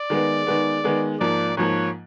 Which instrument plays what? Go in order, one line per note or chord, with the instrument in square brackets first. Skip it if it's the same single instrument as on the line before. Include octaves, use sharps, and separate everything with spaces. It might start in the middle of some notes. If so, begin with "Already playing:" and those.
Already playing: [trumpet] D5
[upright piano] D#3 G#3 B3
D#3 G#3 B3
D#3 G#3 B3
[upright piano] G#2 F3 A#3 [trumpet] D5
[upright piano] G#2 F3 A#3 [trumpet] C#5